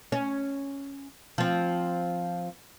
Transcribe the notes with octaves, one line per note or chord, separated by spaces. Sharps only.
C#4
F3 C4